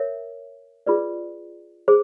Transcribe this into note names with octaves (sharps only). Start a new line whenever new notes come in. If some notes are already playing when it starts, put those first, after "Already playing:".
Already playing: A#4 C#5 E5
F4 G#4 B4 D5
G#4 C5